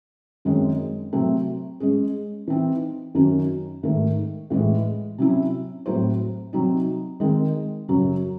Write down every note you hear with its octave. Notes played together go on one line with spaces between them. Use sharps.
F#2 D#3 G#3 C4
C3 F#3 A3 C4
G#3 C#4 G#4
E3 C4 D#4
F#2 D#3 F#3 C#4 F#4
G#2 D#3 A3
A2 E3 G#3
C3 F#3 C#4 E4
A2 F#3 C4 E4 C5
C3 F#3 C4 D#4
D#3 G#3 C4
F#2 C#3 F#3 C#4